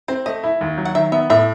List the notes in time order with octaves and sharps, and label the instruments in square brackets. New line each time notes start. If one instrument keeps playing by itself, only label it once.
[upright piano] C4 [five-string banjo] C5
[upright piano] A3 [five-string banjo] D#5
[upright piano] E4
D#2
F#3
[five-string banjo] F#5
[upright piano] D#3 [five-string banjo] E5
[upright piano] B3 [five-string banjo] E5
[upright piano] A2 [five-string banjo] E5